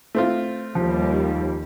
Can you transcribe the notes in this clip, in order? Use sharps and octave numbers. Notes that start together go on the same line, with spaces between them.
A3 C4 F4
D#2 F3 G3